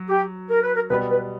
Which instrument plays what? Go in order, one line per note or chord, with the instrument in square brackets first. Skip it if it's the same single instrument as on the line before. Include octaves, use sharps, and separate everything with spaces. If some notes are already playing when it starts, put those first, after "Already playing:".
Already playing: [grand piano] F#3
[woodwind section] G4
A#4
B4
A#4
[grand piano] B2 G3 B3 [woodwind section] B4
[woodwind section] B4